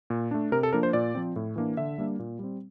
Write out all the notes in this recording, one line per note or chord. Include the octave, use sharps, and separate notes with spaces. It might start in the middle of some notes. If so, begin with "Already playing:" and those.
A#2
A3 D4
C3 A#4
A4
F3 A#3 D4 A#4
C5
A#2 D5
F3 C4
A2
E3 A#3 D4
D3 E5
G3 A#3 D4
A#2
G3 C4